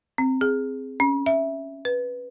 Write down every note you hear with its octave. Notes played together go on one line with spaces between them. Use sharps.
C4
G#4
C#4
E5
B4